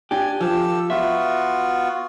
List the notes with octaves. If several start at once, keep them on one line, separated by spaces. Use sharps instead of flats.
D4 G4 G#5
F3 G4 A4 E6
B3 F4 F#4 E5